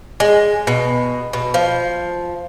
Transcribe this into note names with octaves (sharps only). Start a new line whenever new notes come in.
G#3
B2
B2
F3